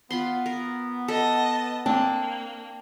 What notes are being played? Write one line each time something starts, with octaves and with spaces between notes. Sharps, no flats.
B3 F4 B5 C6
A#4
A4 D#5 A5
A#3 C4 D4 G5 A5